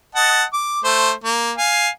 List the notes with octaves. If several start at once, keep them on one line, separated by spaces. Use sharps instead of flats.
D#5 F#5 A5
D6
A3 C5
A#3
F5 G#5